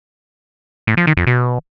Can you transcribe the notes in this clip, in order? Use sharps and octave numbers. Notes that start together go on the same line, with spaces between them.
A2
F3
D#3
F2
B2